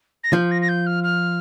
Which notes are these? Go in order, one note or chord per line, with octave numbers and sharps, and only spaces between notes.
A#6
F3 G6
A#6
A#6
G6
F6
F6